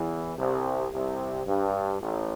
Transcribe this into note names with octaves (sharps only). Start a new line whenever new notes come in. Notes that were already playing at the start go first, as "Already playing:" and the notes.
Already playing: E2 E3
C2 C3
C2 C3
G2
A1 A2